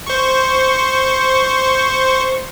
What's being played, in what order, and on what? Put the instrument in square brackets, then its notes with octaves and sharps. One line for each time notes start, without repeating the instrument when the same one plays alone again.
[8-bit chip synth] C5 C#6